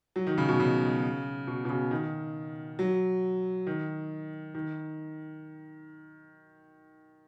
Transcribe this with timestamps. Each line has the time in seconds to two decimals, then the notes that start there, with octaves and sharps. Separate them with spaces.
0.16 F#3
0.27 D#3
0.38 C#3
0.49 B2
0.60 C#3
1.47 B2
1.65 B2
1.69 C#3
1.91 D#3
2.79 F#3
3.67 D#3
4.54 D#3